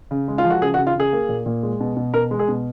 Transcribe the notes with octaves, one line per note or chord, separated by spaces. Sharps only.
C#3
G#3
F4
F3
F#4
C#3 G#4
F#4
C#3
F4
C#3 G#4
A#3
A#2
A#2
G#3
B2
B2
B2 A#4
G#3
G#4
B2